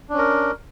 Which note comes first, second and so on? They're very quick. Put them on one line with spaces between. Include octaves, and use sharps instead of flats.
D4 C#4 A#4